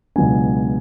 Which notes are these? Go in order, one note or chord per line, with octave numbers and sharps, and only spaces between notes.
C#2 B2 F#3 B3 D4 G#5